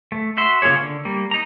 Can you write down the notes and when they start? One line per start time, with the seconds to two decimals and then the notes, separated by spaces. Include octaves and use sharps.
0.12 A3
0.37 F#4 E5 C6
0.62 C#3 A#3 F4 G#4 C#5
0.81 D3
1.05 G3 A#3
1.31 D#4 A#5